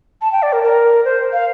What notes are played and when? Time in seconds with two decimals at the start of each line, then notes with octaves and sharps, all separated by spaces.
0.22 A5
0.32 G5
0.43 D5
0.53 A#4
0.63 A#4
1.05 C5
1.33 F5